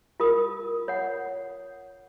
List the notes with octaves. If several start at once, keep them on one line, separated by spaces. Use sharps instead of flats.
F4 A#4 D#6
C#5 F#5